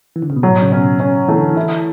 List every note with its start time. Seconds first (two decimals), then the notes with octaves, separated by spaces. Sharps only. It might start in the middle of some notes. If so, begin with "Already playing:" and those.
0.16 E3
0.22 D3
0.30 C#3
0.36 B2
0.43 A2 F#3
0.62 C#3
0.72 B2 C#4
1.00 C#4
1.28 E3 A3
1.38 D3
1.49 E3
1.56 E4